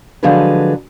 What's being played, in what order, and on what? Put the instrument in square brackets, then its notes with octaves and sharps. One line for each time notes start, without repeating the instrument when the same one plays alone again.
[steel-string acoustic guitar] D3 F3 F#3 G#3 G#4 B4